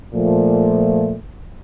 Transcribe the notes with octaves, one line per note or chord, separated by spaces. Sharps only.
A#2 F3 A3